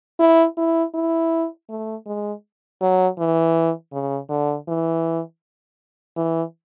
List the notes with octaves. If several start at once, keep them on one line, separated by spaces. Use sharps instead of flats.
E4
E4
E4
A3
G#3
F#3
E3
C#3
D3
E3
E3